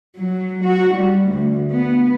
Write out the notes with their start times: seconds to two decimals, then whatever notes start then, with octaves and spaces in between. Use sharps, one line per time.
0.16 F#3
0.64 F#4
0.96 G3
1.29 D2
1.71 B3